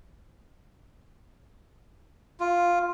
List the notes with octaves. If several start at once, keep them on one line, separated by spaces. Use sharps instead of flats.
F4